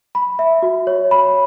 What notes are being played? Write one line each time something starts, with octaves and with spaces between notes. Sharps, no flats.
B5
E5
F#4
C#5
B5